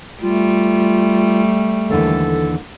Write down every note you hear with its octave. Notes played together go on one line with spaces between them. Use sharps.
G3 A3 F4
D#2 D3 E3 A4